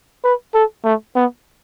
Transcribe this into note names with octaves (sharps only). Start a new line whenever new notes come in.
B4
A4
A3
B3